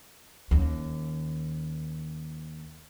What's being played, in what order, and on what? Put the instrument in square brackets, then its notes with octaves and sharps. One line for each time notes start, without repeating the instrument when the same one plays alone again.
[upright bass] D#2 C#4